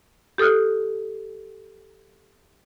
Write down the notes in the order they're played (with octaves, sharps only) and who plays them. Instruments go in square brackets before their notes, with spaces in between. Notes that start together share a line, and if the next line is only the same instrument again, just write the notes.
[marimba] G4 A4 D#6 F6 F#6